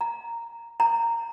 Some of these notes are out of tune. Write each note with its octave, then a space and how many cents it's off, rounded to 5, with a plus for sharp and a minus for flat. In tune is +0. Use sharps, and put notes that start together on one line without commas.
A#5 -5
A#5 -15